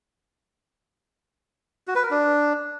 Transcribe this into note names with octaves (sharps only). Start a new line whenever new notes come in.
F#4
B4
A#4
D4